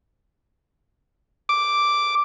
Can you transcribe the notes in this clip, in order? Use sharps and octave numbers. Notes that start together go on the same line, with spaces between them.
D6